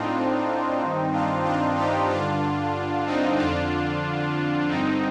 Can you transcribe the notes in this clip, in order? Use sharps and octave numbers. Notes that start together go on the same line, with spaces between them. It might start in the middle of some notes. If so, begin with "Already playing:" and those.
Already playing: A2 C4 D4 D#4 F4
G2
D#3
D4 F4
D4 F4
D#4 G4
G2 D3 D4 F4
C4 D#4
F2 D3 D4 F4
G2 D3 C4 D#4